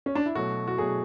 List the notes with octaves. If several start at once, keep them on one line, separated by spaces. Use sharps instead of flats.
C#4
D4
E4
B2 F#3 A3 F#4
F#4
B2 F#3 A3 G#4